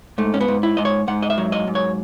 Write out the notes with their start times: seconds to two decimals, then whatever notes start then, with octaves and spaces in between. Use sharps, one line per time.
0.18 G#2 A3
0.34 C#4
0.41 B3
0.48 G#2
0.63 E4
0.77 G#2 D#5
0.85 C#5
1.08 G#2 F#5
1.23 D#5
1.30 E5
1.38 F#3
1.52 D#5
1.67 G#2
1.75 C#5